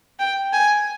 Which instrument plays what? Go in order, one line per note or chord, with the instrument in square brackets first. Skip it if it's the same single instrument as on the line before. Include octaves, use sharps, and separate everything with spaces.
[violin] G5
G#5